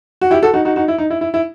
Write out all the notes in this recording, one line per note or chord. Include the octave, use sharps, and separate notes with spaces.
F#4
E4 G4
F#4 A4
D#4 F#4
D#4 F#4
D#4 F#4
E4
D#4
E4
E4
E4